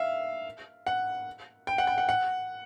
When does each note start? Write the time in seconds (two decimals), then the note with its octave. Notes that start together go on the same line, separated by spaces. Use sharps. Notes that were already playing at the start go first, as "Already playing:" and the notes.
Already playing: E5 F5
0.87 F#5
1.67 G5
1.78 F#5
1.87 G5
1.98 F#5
2.09 F#5